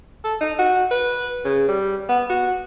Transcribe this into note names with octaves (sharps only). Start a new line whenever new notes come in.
A4
D#4
F#4
B4
C#3
G3
B3
F#4